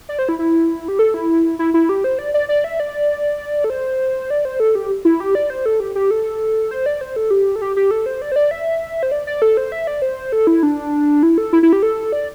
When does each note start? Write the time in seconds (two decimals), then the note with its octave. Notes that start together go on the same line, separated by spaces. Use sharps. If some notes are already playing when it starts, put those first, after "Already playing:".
0.09 D5
0.19 C5
0.29 E4
0.39 E4
0.88 G4
0.99 A4
1.14 E4
1.59 E4
1.74 E4
1.89 G4
2.04 C5
2.19 D5
2.34 D5
2.49 D5
2.64 E5
2.80 D5
3.64 A4
3.70 C5
4.30 D5
4.45 C5
4.60 A4
4.75 G4
5.05 E4
5.20 G4
5.35 D5
5.50 C5
5.66 A4
5.80 G4
5.95 G4
6.11 A4
6.71 C5
6.86 D5
7.01 C5
7.16 A4
7.31 G4
7.56 A4
7.62 G4
7.76 G4
7.91 A4
8.06 C5
8.22 D5
8.32 C5
8.36 D5
8.51 E5
9.03 C5
9.11 D5
9.27 D5
9.42 A4
9.57 C5
9.72 E5
9.87 D5
10.02 C5
10.32 A4
10.47 E4
10.63 D4
11.23 E4
11.38 A4
11.53 E4
11.63 E4
11.73 G4
11.83 A4
12.12 D5